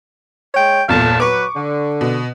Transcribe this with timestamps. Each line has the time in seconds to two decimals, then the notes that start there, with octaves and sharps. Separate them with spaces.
0.55 G#3 C#5 G5
0.89 G1 E2 A#2 A4 F5 A5
1.20 F#3 B4 C#6 D6
1.56 D3
2.01 B2